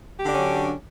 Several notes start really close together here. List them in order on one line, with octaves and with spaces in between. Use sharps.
G4 D3 D4 C#4 F#3